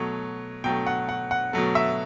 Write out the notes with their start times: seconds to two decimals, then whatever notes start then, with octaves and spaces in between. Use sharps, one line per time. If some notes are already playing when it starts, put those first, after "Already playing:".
Already playing: B2 F#3 A3 C#5
0.64 B2 F#3 A3 G5
0.87 F#5
1.09 F#5
1.31 F#5
1.53 B2 F#3 A3
1.75 E5